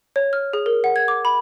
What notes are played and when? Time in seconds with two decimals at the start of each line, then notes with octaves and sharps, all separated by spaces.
0.16 C#5
0.33 F6
0.53 G#4
0.66 A#4
0.84 F#5
0.96 G#6
1.08 D6
1.25 B5